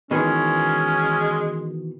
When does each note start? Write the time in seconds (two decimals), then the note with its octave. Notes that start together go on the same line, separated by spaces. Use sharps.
0.11 B2 D#3 E3 G#3 C#4